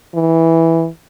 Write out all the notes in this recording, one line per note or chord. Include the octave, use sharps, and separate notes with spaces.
E3